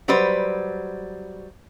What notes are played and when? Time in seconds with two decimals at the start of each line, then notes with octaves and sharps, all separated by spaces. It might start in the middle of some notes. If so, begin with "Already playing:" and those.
0.08 F#3 G3 B4 C5 D5